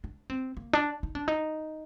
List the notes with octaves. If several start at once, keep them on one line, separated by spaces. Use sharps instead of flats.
D4
C4
A#3
D4
D#4
D4
D#4